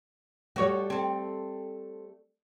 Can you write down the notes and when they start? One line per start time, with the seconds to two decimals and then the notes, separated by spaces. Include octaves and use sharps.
0.56 G3 A3 F#4 C#5
0.90 C4 A4